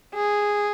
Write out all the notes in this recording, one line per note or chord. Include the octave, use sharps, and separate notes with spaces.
G#4